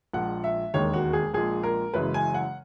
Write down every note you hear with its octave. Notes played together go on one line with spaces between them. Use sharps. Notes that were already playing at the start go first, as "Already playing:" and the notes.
A#1 A#2 G#3 F#5
E5
E1 D#2 D#3 G#3 C#5
F#4
G#4
A#1 A#2 G#3 G#4
A#4
F#1 F#2 C#3 E3 G#3 B4
G#5
F#5